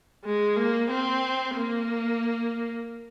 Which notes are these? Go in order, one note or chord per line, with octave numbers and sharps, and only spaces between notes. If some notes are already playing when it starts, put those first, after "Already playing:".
G#3
A#3
C4
A#3